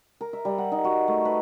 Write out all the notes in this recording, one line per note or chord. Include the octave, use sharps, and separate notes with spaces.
A#4
E5
G3
F#5
D#4
F#4
A3
B4